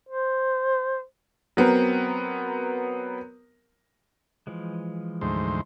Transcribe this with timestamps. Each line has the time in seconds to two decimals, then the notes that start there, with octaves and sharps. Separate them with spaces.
0.09 C5
1.57 F#3 B3 C4 A#4
4.47 E3 F3 G#3
5.21 D2 G#2 C5